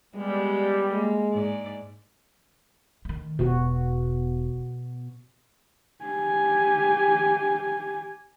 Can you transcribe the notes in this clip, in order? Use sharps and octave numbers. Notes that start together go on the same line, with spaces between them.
G3 G#3 B3
G#3 A#3
G#2 D5
D#3 A3
E1 B2 F#4
G4 G#5